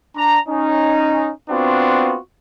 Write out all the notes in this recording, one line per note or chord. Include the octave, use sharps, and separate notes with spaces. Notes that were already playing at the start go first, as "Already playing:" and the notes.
D4 A#5
C#4 D#4
B3 C4 D4 F4 F#4